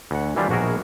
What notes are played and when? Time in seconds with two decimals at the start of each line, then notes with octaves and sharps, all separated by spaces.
0.11 D2 F#5
0.36 D#3 E3 F#3 G3 D4 F4
0.49 A#1 B2 F#4 G#4 A#4